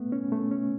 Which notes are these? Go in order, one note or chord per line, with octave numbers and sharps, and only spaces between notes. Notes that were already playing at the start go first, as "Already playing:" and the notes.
Already playing: A3 B3
C#4
A3
C#4